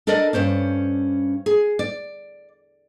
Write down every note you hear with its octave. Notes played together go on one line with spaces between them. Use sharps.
D4 A4 A#4 D5 D#5
G2 C#4 C5 D5
G#4
D5